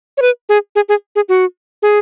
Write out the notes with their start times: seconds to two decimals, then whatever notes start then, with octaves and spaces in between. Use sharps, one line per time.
0.17 C#5
0.22 B4
0.49 G#4
0.76 G#4
0.89 G#4
1.16 G#4
1.29 F#4
1.82 G#4